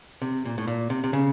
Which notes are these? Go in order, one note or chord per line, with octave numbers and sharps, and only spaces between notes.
C3
A#2
A2
A#2
C3
C3
C#3